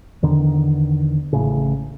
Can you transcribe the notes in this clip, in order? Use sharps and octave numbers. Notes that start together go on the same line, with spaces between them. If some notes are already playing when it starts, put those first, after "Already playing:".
E2 D3 D#3
A1 A2 C#3